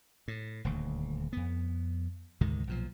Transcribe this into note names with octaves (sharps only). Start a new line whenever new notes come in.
A2
D#1 D2
F2 B3
D2 G#2 C3 D#3
B1 A#2 F3